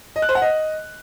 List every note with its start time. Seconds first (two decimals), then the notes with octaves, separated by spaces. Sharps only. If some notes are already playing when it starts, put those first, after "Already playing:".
0.16 D#5
0.22 F#6
0.29 C5
0.35 F#5
0.42 D#5